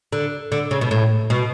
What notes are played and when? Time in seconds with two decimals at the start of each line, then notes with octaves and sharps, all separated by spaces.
0.13 D3
0.52 D3
0.71 C#3
0.81 B2
0.91 A2
1.30 B2